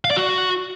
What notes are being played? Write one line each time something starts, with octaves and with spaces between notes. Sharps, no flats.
F5
D5
F#4